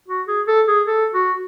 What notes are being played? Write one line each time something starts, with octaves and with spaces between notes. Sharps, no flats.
F#4
G#4
A4
G#4
A4
F#4